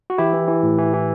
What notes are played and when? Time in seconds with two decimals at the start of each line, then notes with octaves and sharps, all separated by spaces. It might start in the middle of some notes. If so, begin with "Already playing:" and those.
0.10 F#4
0.18 E3 E4 G4
0.33 E3
0.48 E3
0.63 A2
0.78 E3
0.93 E3